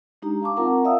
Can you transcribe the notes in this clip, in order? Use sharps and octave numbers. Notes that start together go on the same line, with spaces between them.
G#3 D4 D#4 G4 A#5
F5 A5 C#6 D6
C4 F4 A#4 F#5 A#5
D5 E5 F5 A5 D#6 E6